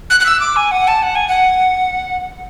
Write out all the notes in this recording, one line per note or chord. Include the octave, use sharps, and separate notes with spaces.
F#6
F#6
E6
D6
G#5
F#5
A5
F#5
G#5
F#5